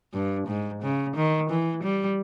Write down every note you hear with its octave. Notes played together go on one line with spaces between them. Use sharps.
G2
G#2
C#3
D#3
E3
G3